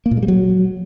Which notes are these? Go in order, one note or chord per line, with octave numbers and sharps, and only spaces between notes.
A#3
A#2
G#3
G3
F#3